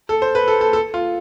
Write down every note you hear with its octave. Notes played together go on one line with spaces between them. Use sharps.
A4
C5
B4
A4
A4
A4
F4